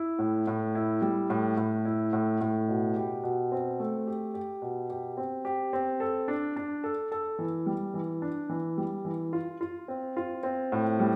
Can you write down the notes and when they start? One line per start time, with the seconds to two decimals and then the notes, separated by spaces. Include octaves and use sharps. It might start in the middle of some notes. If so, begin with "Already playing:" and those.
Already playing: E4
0.19 A2
0.47 A2
0.75 E4
1.02 G3
1.30 A2
1.57 A2
1.85 E4
2.13 A2
2.41 A2
2.68 B2
2.96 G4
3.23 B2
3.52 C4
3.80 A3
4.07 G4
4.34 G4
4.62 B2
4.90 G4
5.17 C4
5.45 G4
5.73 C4
6.00 A4
6.28 D4
6.56 D4
6.84 A4
7.11 A4
7.39 E3
7.66 G3
7.94 E3
8.22 D4
8.49 E3
8.78 G3
9.05 E3
9.33 F4
9.61 F4
9.88 C4
10.17 F4
10.43 C4
10.72 A2
10.99 G3